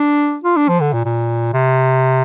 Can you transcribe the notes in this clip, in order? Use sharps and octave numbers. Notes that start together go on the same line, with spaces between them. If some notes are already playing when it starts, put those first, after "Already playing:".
Already playing: D4
F4
D4
F3
D3
A#2
A#2
C3